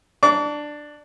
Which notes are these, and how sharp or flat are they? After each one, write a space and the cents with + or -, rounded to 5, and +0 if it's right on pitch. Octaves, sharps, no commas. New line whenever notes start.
D4 +10 D6 -40